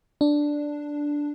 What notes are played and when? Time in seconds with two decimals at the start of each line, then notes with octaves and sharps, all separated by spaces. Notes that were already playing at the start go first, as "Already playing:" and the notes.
0.21 D4